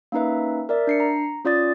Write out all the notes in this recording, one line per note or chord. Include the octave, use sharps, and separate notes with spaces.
A#3 C#4 D#4 B4 E5
A#4 D5 E5
D4 C7 C#7
A#5
C#4 F4 D5 D#6 A6